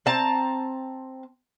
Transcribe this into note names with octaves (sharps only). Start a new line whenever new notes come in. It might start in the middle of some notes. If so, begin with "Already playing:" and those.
C4 A5 A#5